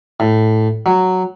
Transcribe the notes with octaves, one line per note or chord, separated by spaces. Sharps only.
A2
F#3